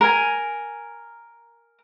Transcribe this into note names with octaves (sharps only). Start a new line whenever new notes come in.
A#4 G#5